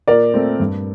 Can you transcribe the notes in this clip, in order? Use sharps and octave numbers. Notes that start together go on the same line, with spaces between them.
A#2 A#4 D5
A3 C4
G2